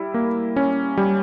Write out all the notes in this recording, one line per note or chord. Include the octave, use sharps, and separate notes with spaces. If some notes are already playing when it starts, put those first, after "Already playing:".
Already playing: G3 E4
A#3
C#4
G3